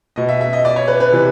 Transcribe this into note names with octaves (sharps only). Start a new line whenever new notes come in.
B2 D#5
E5
E5
D#5
D5
C#5
B4
B4
C3 E3